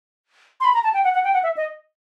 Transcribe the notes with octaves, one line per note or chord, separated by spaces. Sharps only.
C6
B5
A#5
A5
G5
F#5
F#5
G5
F#5
E5
D#5